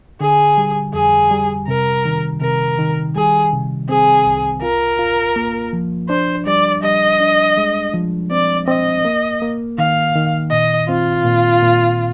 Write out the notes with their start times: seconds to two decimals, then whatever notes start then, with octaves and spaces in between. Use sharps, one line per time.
0.21 D3 G#4
0.58 G3
0.94 F2 G#4
1.31 G3
1.68 C3 A#4
2.05 D#3
2.42 C3 A#4
2.79 D#3
3.15 G3 G#4
3.52 C3
3.89 C4 G#4
4.26 C2
4.62 F4 A#4
4.99 F4
5.36 A#3
5.73 F3
6.09 D4 C5
6.46 G3 D5
6.83 G3 D#5
7.20 D4
7.57 G#3
7.94 F3
8.31 C4 D5
8.67 C4 D#5
9.05 A#3
9.42 A#3
9.78 D#3 F5
10.15 D#3
10.51 A#2 D#5
10.89 C4 F4
11.25 A#2
11.62 A#2